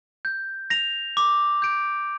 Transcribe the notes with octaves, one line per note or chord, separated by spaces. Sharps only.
G6
A#6 F7
D6
G6 D7